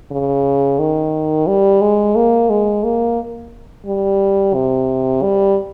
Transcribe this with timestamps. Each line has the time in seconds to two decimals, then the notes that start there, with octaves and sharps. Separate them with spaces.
0.11 C#3
0.79 D#3
1.47 G3
1.81 G#3
2.16 A#3
2.50 G#3
2.84 A#3
3.86 G3
4.54 C3
5.22 G3